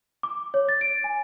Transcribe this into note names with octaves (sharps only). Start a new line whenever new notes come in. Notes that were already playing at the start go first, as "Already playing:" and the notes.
D6
C#5
A6
D7
G#5